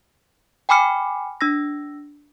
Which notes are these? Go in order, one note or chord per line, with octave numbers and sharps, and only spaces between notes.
G5 G#5 B5 D6 F6 C#7
D4 E6 A#6